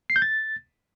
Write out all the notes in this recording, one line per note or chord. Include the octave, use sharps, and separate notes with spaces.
C7
G6
A6